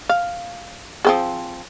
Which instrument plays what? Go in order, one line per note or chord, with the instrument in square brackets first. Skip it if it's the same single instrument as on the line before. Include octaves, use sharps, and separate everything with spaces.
[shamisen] F5
F3 C4 G#4